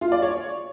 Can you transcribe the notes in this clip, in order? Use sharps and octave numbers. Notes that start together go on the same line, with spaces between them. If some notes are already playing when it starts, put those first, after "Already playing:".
F4
D5
C#5